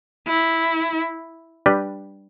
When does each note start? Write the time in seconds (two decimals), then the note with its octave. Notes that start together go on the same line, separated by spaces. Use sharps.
0.27 E4
1.66 G3 D4 G4 B4